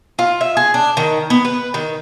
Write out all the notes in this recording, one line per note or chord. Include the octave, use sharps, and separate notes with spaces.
F4
E5
G#4
D4
D#3
B3
B4
D#3